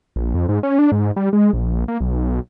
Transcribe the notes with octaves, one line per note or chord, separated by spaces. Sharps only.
A#1
F2
G#2
C#4
D4
G#2
G3
G#3
A#1
A#3
B1